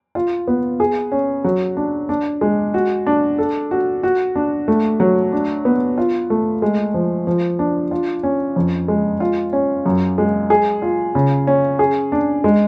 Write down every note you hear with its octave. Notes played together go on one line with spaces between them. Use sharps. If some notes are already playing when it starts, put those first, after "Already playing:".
F4
B3
G#4
C#4
F#3
D4
D4
G#3
F#4
D4
A4
F#4
F#4
D4
A3
F#3
D4
B3
F4
A3
G#3
F3
F3
D4
F4
C#4
F2
G#3
F4
C#4
F#2
G#3
G#4
F4
C#3
C#4
G#4
D4
G#3